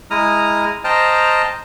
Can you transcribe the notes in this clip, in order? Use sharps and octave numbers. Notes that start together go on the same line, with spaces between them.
G#3 E4 A#5 D#6 F6
C5 D#5 G5 A5 A#5 F6